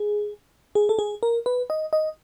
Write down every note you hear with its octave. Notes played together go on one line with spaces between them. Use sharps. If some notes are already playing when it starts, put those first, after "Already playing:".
Already playing: G#4
G#4
A4
G#4
A#4
B4
D#5
D#5